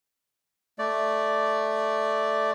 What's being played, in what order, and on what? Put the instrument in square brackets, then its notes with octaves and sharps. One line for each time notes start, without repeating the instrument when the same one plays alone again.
[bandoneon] A3 D5